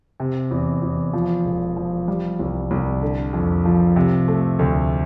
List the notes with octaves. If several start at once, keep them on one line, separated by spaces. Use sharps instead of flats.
C3
E2
E2
F3
E1
F3
G3
C2
C2
D3
F2
F3
C3
A3
D2